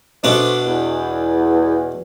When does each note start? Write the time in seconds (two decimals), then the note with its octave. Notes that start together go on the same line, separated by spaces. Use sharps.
0.24 B2 A3 D4 C5 D6
0.66 E2